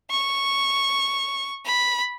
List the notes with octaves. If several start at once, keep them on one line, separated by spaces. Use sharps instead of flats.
C#6
B5